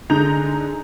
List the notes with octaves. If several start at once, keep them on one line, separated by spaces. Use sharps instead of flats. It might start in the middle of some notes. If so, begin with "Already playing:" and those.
D3 G#3 D#4 A#5 G6 F7